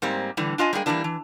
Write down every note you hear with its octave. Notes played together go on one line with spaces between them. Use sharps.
G#2 G3 A#3 C4
A2 D3 E3 G3
D4 F4 D#5 G#5
G3 G#3 A#3 G#4 G5
E3 F3 G3 A#3 D4 E4
E3